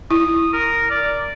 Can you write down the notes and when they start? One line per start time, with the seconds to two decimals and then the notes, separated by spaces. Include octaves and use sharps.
0.11 E4 D#6
0.53 A#4
0.90 D5